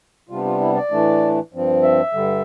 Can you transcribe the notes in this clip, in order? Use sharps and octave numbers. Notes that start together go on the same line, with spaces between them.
C3 G3 B3 D4 F4
F4
E4
D5
A2 E3 A3 D4
G2 F3 C4
E5
G2 D3 G3